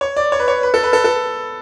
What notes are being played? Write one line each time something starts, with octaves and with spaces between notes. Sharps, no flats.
C#5
D5
C#5
B4
C#5
B4
A4
B4
A4
A4